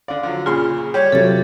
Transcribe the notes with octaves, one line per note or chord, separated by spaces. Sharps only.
D3 D5 F5
D3 F3 F#3
A#2 C#3 F4 G#4 B5 C6 F6
G3 G4 C#5
C3 F#3 F4 A4 A6